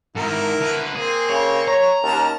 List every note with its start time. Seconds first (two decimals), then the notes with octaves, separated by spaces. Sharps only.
0.16 G#2 D#3 E4 A#4
0.61 D3 B4
0.95 A#3 C4 G#4
1.30 C#3 C#5
1.68 C#5 A#5
2.03 D#2 C#4 A#4 A5